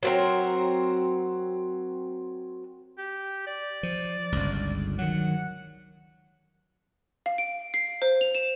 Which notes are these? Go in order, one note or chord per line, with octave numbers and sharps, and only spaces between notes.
F#3 C4 A#4
G4
D5
F3
G1 C#2
D#3 F#3 F#5
F5
D7
C7
C5
F7
E7